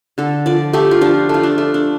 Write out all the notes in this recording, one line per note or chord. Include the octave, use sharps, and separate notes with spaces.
D3 A4
F3 D5
A3 G4
F4
F3 D4
A3 F4
D4
A3
D4